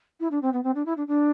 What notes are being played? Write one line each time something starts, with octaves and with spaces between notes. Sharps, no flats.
E4
D4
C4
B3
C4
D4
E4
D4
D4